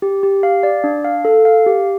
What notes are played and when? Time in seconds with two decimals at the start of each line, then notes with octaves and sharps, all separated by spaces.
0.02 G4
0.23 G4
0.43 F5
0.63 D5
0.84 D4
1.05 F5
1.25 A4
1.45 F5
1.66 G4